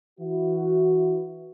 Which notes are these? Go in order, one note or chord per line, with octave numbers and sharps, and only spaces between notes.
E3 E4 F#4